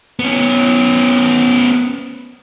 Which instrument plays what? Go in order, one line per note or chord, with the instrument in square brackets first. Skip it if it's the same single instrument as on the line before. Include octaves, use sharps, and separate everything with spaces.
[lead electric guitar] B3 C#4